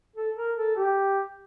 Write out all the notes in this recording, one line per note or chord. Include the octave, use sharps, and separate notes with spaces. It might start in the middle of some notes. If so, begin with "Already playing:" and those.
A4
A#4
A4
G4